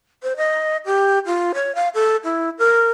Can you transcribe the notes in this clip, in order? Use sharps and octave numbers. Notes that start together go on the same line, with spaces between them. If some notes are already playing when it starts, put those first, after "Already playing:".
C5
D#5
G4
F4
C#5
F5
A4
E4
A#4